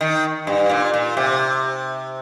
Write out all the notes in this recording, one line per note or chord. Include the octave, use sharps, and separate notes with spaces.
D#3
G2
A#2
A#2
C3